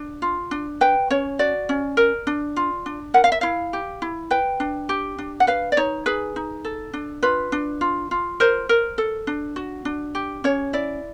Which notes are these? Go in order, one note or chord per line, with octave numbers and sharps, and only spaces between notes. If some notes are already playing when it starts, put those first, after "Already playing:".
Already playing: D4
F4
D4
B4 G5
C#4 C#5
F#4 D5
C#4
A#4
D4
F4
D4
A#4 F#5
F5
E5
E4 F5
G4
E4
B4 G5
D4
G4
D4
F#5
B4 F5
D5
D#4 C#5
G#4 B4
D#4
A4
D4
F4 B4
D4
F4
F4
A#4 C5
A#4
A4
D4
F#4
D4
G4
C#4 C#5
E4 D5